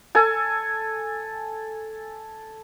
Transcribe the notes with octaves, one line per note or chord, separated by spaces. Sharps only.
A4 G#5